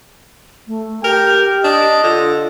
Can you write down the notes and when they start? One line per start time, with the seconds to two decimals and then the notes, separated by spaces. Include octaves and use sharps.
0.68 A3
1.04 G4 A#4 G5
1.64 D4 D#5
2.04 D3 F4